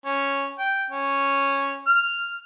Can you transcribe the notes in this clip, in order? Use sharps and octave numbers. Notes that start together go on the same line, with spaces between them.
C#4
G5
C#4
F6